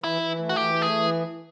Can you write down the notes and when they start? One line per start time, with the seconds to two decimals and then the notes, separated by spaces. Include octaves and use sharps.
0.04 E3 E4
0.21 E3
0.38 A3
0.49 F#4
0.56 E3 G4
0.74 A3
0.82 G#4
0.91 E3